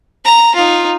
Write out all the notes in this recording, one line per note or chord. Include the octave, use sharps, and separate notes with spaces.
A#5
D#4 F4